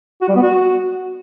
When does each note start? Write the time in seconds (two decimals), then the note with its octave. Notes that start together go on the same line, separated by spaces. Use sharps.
0.22 F#4
0.29 G3
0.36 B3
0.42 F#4